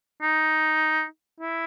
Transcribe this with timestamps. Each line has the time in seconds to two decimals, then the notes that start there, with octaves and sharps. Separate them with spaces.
0.22 D#4
1.40 E4